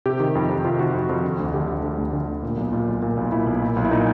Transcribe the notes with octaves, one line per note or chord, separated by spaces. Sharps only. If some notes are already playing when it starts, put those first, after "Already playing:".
C3 G4
D#3
F2
F2
C3 F4
D#3 F#4
F2
F2
D3
D2
D3 G4
D2
D3
D2
D3
D2
A#2
B1
A#2 F4
B1
A#2
B1
A#2 E4
B1
A#2
B1
E4
A#2 D#4